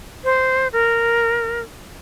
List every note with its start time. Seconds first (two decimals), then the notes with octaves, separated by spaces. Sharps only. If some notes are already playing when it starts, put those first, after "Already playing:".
0.24 C5
0.73 A#4